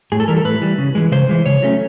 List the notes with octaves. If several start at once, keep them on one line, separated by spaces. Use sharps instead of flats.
A2 G#4
A4
E3 G3 A#4
A4
A2 B4
E3 G3
C#3
E3 G#3
C#3 C5
E3 G#3
C#3 C#5
F#3 A3 C#4